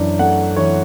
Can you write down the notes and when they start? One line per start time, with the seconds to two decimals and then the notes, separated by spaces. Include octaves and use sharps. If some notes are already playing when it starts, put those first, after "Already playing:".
Already playing: F#2 E3 D4
0.19 A3 F#5
0.56 E3 C#5